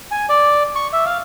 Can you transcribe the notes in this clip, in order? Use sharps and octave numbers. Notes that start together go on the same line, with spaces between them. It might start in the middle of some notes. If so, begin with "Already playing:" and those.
G#5
D5
C#6
E5
F5